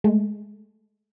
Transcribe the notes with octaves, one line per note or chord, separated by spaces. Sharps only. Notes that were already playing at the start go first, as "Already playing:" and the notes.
G#3 A3